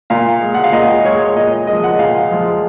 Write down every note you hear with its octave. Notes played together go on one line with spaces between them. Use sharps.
A#2 F5
G#3
F#5
F5
A#2 D#5
G#3 C#5
A#2 D#5
D#5
F3 G#3 D#5
F#5
A#2 F5
F3 G#3